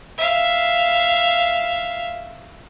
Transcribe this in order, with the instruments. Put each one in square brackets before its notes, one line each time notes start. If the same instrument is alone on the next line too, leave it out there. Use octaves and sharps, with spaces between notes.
[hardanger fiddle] E5 F5